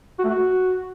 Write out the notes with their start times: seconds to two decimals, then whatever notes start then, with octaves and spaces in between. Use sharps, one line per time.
0.19 F#4
0.24 A3
0.30 F#4